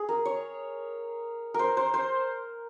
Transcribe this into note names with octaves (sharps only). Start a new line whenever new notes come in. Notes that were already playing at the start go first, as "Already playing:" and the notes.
Already playing: G#4
A#4
C#5
A#4 C5
C5
C5